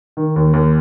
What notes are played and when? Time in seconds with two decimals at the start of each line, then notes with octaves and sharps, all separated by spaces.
0.17 D#3
0.36 D#2
0.53 D#2